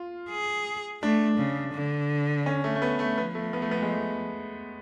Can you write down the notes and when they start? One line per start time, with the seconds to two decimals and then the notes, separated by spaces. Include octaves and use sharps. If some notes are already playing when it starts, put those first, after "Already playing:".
Already playing: F4
0.30 G#4
1.03 A3 D4
1.38 C#3
1.74 D3
2.46 C#4
2.64 A3
2.75 A3
2.82 B3
2.99 A3
3.18 F3 B3
3.35 A3
3.53 B3
3.62 A3
3.71 B3
3.82 G#3
3.90 A3